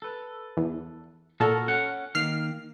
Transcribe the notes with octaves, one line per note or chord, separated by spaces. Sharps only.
A4 B4
E2
A#2 F#4 A4 A#4
C#4 F#5
D#3 A#3 F6 C7